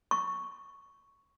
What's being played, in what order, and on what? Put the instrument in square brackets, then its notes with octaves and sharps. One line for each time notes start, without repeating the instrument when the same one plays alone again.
[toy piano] C#6